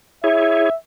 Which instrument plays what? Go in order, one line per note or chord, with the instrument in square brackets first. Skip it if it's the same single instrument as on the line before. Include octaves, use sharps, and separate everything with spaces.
[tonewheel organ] E4 G#4 C#5 [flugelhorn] E5